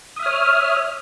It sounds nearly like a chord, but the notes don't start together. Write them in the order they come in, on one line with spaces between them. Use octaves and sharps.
D#6 E5 F6 C#5